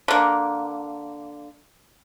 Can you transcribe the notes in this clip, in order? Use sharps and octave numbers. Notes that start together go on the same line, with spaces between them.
D3 A#3